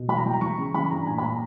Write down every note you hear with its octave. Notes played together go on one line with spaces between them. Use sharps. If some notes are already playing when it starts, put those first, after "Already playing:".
Already playing: B2
E3 B5
A#5
E3 G5
A#5
E3 C#6
C#3
E3 B5
G2 A#5
A#2 G#5
B5
A#2 A#5